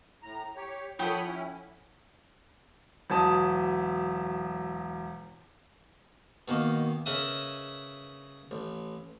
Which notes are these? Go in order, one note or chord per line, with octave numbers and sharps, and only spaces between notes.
A2 A#5
G4 C#5
F3 G4 A4 C#5 F#5 B5 D#6
C#4 E4
E1 F#3 A5 D#6
B2 D#3 A#3
C#3 A#4 B4 D#5 E5 D#6
A1